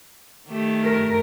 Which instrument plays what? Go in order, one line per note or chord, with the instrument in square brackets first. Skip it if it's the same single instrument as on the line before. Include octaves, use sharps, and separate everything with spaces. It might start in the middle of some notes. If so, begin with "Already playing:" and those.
[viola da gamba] D#3 A3 G4
[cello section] A#4